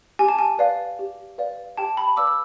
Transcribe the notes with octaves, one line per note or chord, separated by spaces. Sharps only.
G4 G#5
A5
G#5
B4 D5 F5
G4
B4 D5 F5
G4 G5 A5
A5 B5
B4 D5 F5 D6 E6
E6